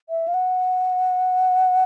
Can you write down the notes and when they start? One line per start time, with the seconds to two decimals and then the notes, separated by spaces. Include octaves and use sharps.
0.09 E5
0.28 F5
0.34 F#5